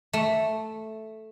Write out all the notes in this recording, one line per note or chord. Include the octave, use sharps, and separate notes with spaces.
A3